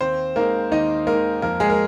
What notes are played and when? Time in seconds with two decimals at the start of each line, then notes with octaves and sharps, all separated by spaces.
0.01 D#2 C4 C5
0.36 D#3 G#3 A#3 A#4
0.71 D#2 D#4 D#5
1.07 D#3 G#3 A#3 A#4
1.42 F2 A#3 A#4
1.60 G#3 G#4
1.70 A#4